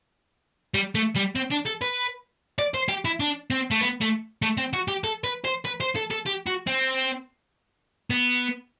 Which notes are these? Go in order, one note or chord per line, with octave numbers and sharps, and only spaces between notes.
G3
A3
G3
C4
D4
A4
B4
D5
C5
G4
E4
D4
C4
A3
B3
A3
A3
C4
F#4
G4
A4
B4
C5
B4
C5
A4
A4
G4
F#4
C4
B3